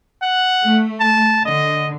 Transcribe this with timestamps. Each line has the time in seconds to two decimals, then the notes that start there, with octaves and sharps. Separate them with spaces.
0.22 F#5
0.64 A3
1.00 A5
1.45 D3 D#5